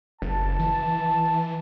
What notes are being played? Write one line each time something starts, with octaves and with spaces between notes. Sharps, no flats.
F#1 A5
E3